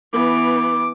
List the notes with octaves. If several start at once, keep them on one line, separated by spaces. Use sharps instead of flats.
E3 B3 D6